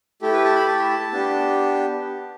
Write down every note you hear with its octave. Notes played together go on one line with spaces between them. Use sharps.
A3 E4 G4 A4
B4
A5
B5
A5
B3 D4 G4